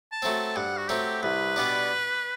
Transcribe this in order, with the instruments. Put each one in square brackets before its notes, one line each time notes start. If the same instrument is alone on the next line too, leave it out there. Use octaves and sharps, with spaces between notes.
[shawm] A5
[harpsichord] F#3 A3 C4
[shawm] A5
[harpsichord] G2 [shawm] F#5
[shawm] F#4
[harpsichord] F#3 A3 C4 [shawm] G4
[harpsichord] C2 [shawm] B4
[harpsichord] B2 G3 B3 D4